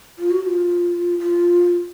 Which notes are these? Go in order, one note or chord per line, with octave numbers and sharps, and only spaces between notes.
F4
F#4
F4
F4